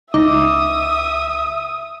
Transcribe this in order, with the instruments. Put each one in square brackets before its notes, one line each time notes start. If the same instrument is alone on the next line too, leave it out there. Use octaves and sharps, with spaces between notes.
[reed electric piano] C#2 D6 [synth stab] D#4 [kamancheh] E5 D#6